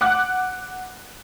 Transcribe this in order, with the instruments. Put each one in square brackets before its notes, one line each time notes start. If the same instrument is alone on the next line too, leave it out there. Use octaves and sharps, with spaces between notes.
[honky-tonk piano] F#5 D6 F#6